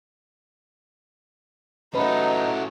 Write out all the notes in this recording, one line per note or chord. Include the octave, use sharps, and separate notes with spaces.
F#3 A3 C#4 D#4 A4 B4